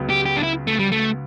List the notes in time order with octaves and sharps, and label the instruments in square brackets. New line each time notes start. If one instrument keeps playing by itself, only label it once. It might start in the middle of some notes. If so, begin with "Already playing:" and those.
Already playing: [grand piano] C#2 C#3 F#3 B3
[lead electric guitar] G4
G4
D4
E4
A3
G3
A3